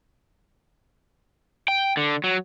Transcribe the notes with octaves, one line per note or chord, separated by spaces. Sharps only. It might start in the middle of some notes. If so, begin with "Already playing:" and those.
G5
D3
F#3